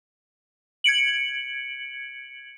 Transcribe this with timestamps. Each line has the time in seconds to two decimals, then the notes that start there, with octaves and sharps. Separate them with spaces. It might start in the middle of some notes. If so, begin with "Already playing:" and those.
0.84 G#6 C#7 D7 F#7